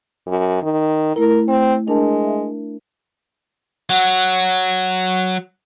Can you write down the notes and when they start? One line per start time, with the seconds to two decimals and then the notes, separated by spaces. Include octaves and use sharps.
0.27 F#2
0.62 D#3
1.16 A3 E4 A#4
1.48 A3 C4
1.88 G#3 D4 A#4 A5
2.24 E5
3.90 F#3 F#5